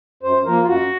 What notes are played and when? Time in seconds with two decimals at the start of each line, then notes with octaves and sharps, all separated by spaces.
0.23 F#2 C5
0.45 F3 A#3 A#4
0.62 F4
0.67 F#2 F#4